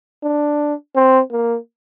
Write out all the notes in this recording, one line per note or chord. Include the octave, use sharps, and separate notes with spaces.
D4
C4
A#3